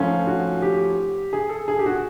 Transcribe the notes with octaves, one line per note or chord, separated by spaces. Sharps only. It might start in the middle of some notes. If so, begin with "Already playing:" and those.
Already playing: G#2 F3 A3 C#4 F4
F#4
G4
G#4
A4
G#4
G4
F#4